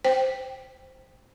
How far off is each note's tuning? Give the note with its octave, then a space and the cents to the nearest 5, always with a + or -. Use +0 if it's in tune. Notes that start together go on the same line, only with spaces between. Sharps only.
C5 +0 G5 +10